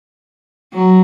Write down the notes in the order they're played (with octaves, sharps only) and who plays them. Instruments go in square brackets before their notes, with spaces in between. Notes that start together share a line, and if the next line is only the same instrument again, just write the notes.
[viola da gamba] F#3